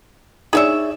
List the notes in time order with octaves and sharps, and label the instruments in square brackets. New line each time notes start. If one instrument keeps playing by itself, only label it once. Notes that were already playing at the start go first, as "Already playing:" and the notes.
[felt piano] D#4 D5 [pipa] G#4 C#5 E5